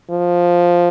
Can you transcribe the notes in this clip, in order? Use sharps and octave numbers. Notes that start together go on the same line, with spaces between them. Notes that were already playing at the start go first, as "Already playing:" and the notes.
F3